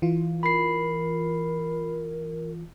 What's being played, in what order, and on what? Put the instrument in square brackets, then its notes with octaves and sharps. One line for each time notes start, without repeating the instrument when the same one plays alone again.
[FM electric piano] E3 F4
[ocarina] A#4 [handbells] B5 C7